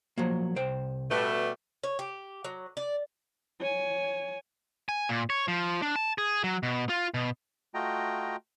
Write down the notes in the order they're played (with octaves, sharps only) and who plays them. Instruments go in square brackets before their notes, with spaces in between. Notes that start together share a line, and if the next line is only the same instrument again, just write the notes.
[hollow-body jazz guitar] F3 F#3 A#3
C2 C5 G5
[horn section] B2 G3 A3 [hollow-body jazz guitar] B4 A5
[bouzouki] C#5
G4
F#3
D5
[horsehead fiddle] C#5 G#5
[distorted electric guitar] G#5
A#2
C#5
F3
D4
A5
G#4
F#3
B2
F4
B2
[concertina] A3 F4 F#4 D#5 G5 A#5